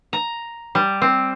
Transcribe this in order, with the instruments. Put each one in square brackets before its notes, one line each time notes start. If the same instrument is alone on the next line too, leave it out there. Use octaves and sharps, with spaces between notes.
[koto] A#5
G3
C4